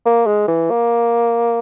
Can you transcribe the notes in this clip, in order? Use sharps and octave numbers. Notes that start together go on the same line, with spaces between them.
A#3
G#3
E3
A#3